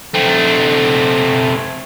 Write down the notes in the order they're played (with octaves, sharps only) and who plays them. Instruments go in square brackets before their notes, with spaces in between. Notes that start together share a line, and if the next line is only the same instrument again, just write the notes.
[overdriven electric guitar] A3 C4